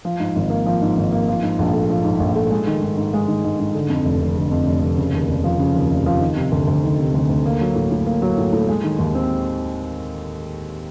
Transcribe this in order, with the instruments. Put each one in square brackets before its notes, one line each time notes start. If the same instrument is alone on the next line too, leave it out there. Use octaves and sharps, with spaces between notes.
[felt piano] F3
G#2
G#1
A#3
F3
G#2
G#1
A#3
F3
G#2
A#1
A3
F3
G#2
A#1
A3
G#3
D#3
G#2
G#2
G#3
D#3
G#2
G#2
D3
F2
F1
F1
D3
F2
F1
F1
C#3
D#2
F1
F3
C#3
D#2
F1
F3
D#3
C3
D2
D2
D#3
C3
D2
D2
A#3
F#3
A2
A2
A#3
F#3
A2
A2
G#3
D#3
D#2
C4